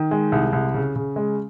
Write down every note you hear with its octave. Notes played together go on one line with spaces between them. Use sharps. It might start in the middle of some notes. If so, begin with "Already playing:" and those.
Already playing: D#3
G#3
C2
C2
C#3
C#3
G#3